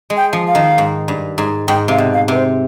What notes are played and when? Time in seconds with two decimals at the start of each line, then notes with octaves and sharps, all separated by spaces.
0.10 G#3
0.17 G5
0.33 F3
0.47 F5
0.55 D#3
0.78 G#2
1.08 G2
1.38 G#2
1.68 G#2 G5
1.88 C3 F5
1.98 B2
2.13 F5
2.28 C3 B4
2.36 C5